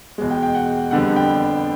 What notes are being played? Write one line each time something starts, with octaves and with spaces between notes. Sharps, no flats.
E2 B2 G#3
G5
G5
F#5
F2 D3 G3 B3 F#5
G5